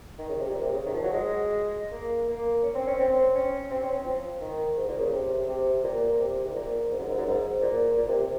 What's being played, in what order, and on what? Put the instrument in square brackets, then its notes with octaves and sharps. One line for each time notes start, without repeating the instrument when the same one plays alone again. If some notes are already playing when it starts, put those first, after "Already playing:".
[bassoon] D#3
C#3
C3
A#2
C3
C#3
D#3
F3
F#3
G#3
A#3
A#3
C#4
C4
C#4
C4
C#4
C4
C#4
C4
F3
D#3
G#2
A#2
C#3
C3
C3
A#2
C3
G#2
A#2
G#2
F#2
G#2
F#2
G#2
A#2
A#2
C3
C3